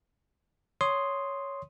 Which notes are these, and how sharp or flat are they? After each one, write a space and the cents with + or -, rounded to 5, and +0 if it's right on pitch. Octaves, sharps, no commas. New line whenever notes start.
C#5 +5 C6 +0 D#6 +0